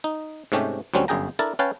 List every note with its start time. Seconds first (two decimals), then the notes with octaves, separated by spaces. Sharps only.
0.04 D#4
0.52 G#2 C3 A3 C#4 G4
0.94 D2 F#3 G3 C4 C#4
1.08 G1 F#2 G#4 G5 A#5
1.39 D4 E4 A4 A#4 A5
1.59 C#4 B4 C#5 F5 G5 A5